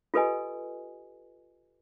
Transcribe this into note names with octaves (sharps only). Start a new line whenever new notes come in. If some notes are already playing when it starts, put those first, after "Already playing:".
F4 G4 A4 B4 D#5 G#5